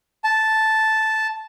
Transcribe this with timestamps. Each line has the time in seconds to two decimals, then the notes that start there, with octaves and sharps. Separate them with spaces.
0.24 A5